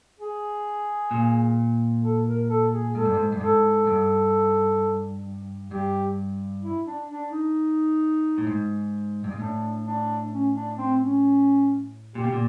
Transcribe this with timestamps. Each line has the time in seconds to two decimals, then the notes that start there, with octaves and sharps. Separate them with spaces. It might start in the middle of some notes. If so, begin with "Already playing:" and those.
0.19 G#4
1.11 A#2
2.03 A4
2.27 A#4
2.50 A4
2.72 G#4
2.95 G#2 A4
3.05 G2
3.15 G#2
3.32 G2
3.41 G#2 A4
3.87 G2
5.71 G2 G4
6.63 E4
6.87 D4
7.10 D4
7.32 D#4
8.38 A2
8.47 G#2
9.24 G2
9.31 G#2
9.39 A2 D4
9.86 D4
10.32 C#4
10.54 D4
10.78 C4
11.00 C#4
12.15 A#2 G4
12.24 B2
12.33 A#2